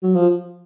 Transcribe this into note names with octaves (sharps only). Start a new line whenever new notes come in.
F#3
F3